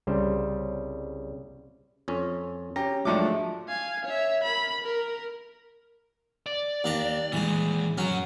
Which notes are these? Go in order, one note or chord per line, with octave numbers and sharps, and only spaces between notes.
C2 C#3 G3 C5
F2 C#4
C#4 G4 A#5
G#2 F3 F#3 A3 D4 D6
F5 G#5
C#5 E5
A#4 B5
A#4
D5
D#2 D4 A#5
A#2 D#3 E3 G#3
F#2 F#3 C#4 F#5